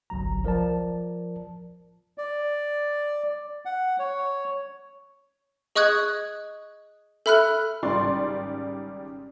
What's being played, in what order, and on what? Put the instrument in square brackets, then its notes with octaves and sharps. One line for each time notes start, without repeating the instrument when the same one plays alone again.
[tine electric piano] G1 C2 F#3 A#5
F3 A#4 D5 A5
[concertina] D5
F#5
C#5
[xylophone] G#4 D#5 C#6 D#6 F#6 G#6
A4 E5 B5 F6 F#6
[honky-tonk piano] G#1 C#3 G3 D5 C6